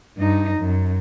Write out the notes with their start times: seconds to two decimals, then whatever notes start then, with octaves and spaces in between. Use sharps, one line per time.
0.17 G2 D#4
0.59 F#2